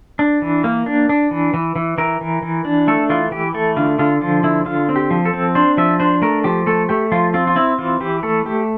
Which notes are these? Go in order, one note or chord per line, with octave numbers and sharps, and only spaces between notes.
D4
E3
A#3
D4
D4
E3
E3
E3
E3 A#4
E3
E3
D4
A3 A4
E3 F4
E3 G4
A3 A4
D3 F4
D3 F4
F3 F4
D3 E4
D3 F4
C4
G4
F3
A4
C4
D4 C5
F3 E5
D4 C5
A3 A#4
F3 G4
A3 A4
A3 G4
F3 F4
C4 F4
F4
C4 E4
E3 F4
E3 G4
A3 A4
A3 G4